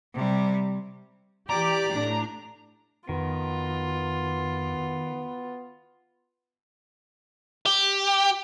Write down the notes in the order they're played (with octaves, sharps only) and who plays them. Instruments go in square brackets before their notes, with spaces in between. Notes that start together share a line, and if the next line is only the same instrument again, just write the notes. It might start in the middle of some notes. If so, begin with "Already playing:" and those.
[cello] C3 G3
[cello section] E3 G4 [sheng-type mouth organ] D5 D6 [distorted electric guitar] A#5
[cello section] A2 D4
[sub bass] F2 [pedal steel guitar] D#3 [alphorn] B3 [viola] F4
[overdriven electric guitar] G4